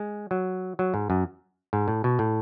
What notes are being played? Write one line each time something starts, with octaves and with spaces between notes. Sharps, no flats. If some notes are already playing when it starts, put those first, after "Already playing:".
Already playing: G#3
F#3
F#3
G#2
F#2
G#2
A2
B2
A2